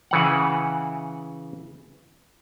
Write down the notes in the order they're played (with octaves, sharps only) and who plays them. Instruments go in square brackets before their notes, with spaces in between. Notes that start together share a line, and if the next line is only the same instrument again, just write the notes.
[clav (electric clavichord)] C#3 E3 F#5